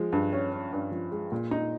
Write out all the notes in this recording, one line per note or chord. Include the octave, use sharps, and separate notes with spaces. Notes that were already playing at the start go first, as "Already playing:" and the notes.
Already playing: F3 G#3
G2
C#4
C#4
G2
F3
G#3
A#2
D#4